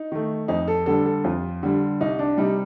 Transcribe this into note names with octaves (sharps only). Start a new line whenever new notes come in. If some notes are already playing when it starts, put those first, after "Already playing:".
Already playing: D#4
D#3 A3
F2 D#4
A4
D3 G3 A4
A4
F2 F4
D3 G3
C2 D#4
D4
C3 G3 D#4